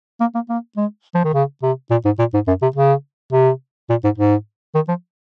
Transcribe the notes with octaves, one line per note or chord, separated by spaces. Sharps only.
A#3
A#3
A#3
G#3
F3
D#3
C#3
C3
A#2
G#2
A#2
G#2
F#2
C3
C#3
C3
A#2
G#2
G#2
D#3
F3